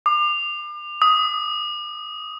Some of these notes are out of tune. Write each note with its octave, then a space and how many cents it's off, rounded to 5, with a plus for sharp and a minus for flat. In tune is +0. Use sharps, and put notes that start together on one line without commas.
D6 +40
D#6 +10